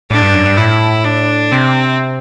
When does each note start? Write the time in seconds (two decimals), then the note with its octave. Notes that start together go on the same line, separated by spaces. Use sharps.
0.10 A2 D4
0.22 G2
0.34 F#2
0.46 G2
0.57 A2 E4
1.05 D4
1.52 C3 C4